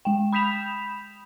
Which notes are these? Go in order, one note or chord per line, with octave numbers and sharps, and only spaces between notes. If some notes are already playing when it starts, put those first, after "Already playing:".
G#3 G5
B5 D#6 G6 B6 E7 F7